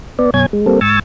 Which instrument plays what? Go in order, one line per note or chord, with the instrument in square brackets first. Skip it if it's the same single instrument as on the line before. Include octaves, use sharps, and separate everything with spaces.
[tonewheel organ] B3 D5
F#2 B2 C#5 G#5 G#6
G#3
G3 A#3 C4 A4
G#2 G#5 C#6 E6 A6